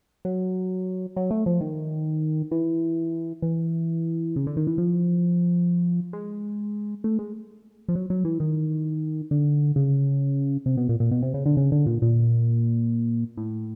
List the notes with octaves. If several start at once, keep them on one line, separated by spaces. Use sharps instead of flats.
F#3
F#3
A3
F3
D#3
E3
E3
C#3
D3
D#3
E3
F3
G#3
A3
G#3
F3
F#3
F#3
E3
D#3
D3
C#3
C3
B2
A#2
A#2
B2
C3
C#3
D3
C#3
D3
A#2
A#2
A2